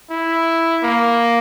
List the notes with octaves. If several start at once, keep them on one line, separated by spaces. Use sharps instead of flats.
E4
A#3